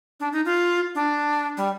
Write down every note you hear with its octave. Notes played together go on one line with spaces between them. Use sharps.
D4
D#4
F4
D4
G3